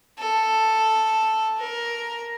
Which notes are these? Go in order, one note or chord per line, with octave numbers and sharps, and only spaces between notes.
A4
A#4